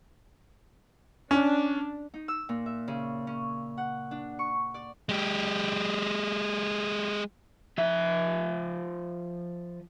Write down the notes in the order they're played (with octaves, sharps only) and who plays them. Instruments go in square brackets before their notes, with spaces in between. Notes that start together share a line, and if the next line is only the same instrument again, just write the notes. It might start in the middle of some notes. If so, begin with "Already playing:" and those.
[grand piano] C#4 [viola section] D4
[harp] D#4
E6
A#2
E5
C#3
C#4
F#5
D4
C#6
D5
[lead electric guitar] G#3 G4
[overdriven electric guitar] F3 E5